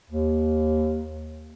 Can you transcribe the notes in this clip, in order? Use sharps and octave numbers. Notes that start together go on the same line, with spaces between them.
D#2